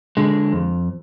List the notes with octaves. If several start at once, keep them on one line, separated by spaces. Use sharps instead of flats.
D3 G#3
F2